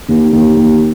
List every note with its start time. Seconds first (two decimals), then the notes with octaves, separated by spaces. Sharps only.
0.08 D#2
0.33 D#2
0.57 D#2